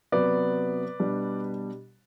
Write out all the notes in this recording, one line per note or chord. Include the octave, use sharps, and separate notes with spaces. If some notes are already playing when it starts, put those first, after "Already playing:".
C3 F#3 B3 B4 D5
B2 G3 D4